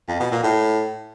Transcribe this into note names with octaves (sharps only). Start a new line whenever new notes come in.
F2
B2
A#2
A2